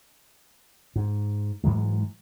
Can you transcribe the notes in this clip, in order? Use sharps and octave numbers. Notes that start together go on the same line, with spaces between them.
G#2
G#2 E3 F#3 G#3